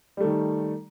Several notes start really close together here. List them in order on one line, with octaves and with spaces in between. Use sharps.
G3 A3 D#3